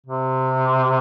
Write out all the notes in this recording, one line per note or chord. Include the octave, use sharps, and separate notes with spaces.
C3